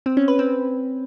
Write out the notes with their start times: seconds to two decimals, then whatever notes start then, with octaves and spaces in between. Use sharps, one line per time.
0.06 C4
0.17 C#4
0.28 B4
0.39 C4